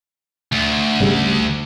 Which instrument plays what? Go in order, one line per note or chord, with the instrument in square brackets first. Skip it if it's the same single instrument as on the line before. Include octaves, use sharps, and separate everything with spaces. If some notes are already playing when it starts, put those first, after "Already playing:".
[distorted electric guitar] D2
[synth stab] G#1 C#3 G3